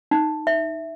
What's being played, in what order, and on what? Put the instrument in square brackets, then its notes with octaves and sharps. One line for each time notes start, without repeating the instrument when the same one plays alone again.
[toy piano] D#4
E5